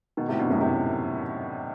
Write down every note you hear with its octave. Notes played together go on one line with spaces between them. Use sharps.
B2 D#3
A2 C3
G2 B2
F#2 A2
A2 C3